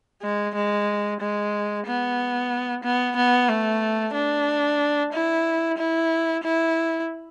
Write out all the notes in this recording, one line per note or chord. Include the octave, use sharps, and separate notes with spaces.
G#3
G#3
G#3
B3
B3
B3
A3
D4
E4
E4
E4